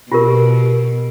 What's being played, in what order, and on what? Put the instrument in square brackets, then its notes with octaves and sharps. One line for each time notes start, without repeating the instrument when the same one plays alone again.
[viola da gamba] B2 [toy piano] F4 G4 A#4